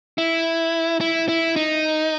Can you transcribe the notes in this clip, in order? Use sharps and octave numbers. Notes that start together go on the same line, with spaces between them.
E4
E4
E4
D#4